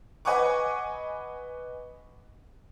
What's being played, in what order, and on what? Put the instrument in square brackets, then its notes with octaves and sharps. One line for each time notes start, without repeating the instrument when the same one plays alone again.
[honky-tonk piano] B4 D#5 F#5 G#5 C#6 D6